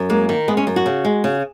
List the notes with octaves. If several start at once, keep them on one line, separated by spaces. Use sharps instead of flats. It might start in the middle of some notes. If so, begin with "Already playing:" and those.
Already playing: F#2
G#3 A#3
D#3
G#3 B3
C#4
F#2
F#4
C#3
G#3
C#3